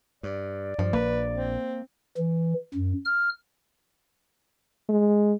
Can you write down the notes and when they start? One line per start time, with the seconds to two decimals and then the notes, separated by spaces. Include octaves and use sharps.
0.23 G2 D5
0.79 G2 F3
0.93 A#1 A#3 B4
1.33 C4
2.17 E3
2.74 F#2
3.05 F6
4.89 G#3